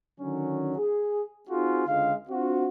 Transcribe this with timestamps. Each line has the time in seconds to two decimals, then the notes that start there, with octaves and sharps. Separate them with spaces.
0.20 D3 D#3 F#3 C#4
0.77 G#4
1.49 C4 D#4 F4 F#4 G#4
1.87 C#2 D3 G#3 F5
2.30 C4 D4 F4 F#4